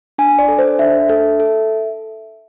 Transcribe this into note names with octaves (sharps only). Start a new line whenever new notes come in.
D4 G#5
D5
A4
C5
D4 E5
A4
A4